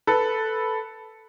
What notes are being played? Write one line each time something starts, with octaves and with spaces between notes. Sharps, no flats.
A4 B4